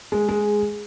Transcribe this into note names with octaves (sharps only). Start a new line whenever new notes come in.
G#3
G#3